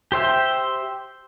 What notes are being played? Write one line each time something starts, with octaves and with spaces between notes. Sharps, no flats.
G4 C5 E5 G5